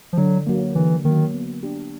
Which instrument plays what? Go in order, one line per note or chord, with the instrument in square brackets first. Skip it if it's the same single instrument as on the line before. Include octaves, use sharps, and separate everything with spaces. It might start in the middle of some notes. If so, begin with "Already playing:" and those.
[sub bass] F3
[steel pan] D3 [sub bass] F#3
[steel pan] F#3 A#3
[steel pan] D3 [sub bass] E3
[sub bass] D#3 [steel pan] F#3 A#3
[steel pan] B3
D4 G4